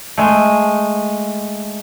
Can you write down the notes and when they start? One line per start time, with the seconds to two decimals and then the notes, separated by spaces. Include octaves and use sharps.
0.17 G#3 A3